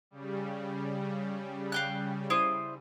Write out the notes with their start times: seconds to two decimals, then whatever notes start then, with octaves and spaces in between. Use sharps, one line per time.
0.11 C#3 G3
1.72 F5 G5 F#6
2.30 E4 C5 D#6